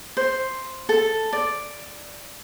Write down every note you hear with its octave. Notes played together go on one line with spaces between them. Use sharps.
C5
A4
D5